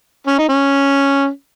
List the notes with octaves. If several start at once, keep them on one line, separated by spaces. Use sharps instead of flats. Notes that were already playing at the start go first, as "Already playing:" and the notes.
C#4
D#4
C#4